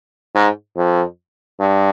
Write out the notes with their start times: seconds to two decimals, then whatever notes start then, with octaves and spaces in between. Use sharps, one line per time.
0.35 G#2
0.77 F2
1.60 G2